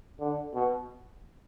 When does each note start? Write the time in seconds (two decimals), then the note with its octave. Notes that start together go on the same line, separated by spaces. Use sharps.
0.20 D3
0.54 B2